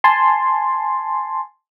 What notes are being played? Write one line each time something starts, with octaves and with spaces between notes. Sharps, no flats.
G#5 A5 C6